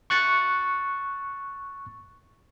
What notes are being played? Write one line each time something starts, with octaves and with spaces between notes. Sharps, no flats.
C#6 F#6 A6 C#7